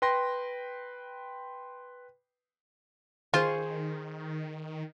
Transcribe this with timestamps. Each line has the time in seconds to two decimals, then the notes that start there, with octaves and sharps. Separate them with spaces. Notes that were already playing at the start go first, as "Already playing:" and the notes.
0.02 B4 G5 C6 A#6
3.34 D#3 F4 G#4 C5 C#6